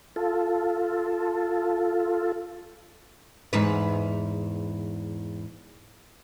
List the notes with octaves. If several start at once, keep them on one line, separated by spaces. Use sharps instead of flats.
F4 A4
E2 G#2 B4